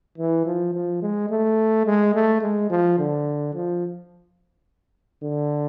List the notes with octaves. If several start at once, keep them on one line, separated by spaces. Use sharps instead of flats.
E3
F3
F3
G#3
A3
G#3
A3
G#3
F3
D3
F3
D3